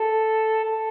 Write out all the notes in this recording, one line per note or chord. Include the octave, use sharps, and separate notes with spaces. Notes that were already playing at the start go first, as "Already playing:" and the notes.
Already playing: A4
A4